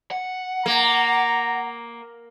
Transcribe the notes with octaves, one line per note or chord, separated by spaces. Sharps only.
F#5
A#3 A#5